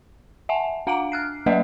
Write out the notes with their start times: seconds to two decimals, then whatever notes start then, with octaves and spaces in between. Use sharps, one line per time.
0.49 E5 F#5 G#5 A5
0.87 D4 F5 F#5 A#5 D6 D7
1.12 F6 F#6 C7
1.46 F#3 A#3 B4 D#5 E5 F#5